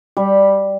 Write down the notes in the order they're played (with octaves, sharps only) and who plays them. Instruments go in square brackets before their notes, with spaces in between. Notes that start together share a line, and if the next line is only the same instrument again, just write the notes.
[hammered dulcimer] G3